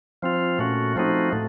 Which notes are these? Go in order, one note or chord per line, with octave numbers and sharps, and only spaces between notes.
F3 C4 F4
A#2 A3 C#4 F#4
F3 A3 C4 D#4 F#4
A2 A3